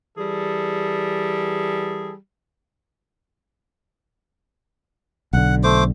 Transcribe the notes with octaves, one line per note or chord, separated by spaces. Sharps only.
E3 G3 G#4 A4
B1 D3 F#5
A3 C5 D6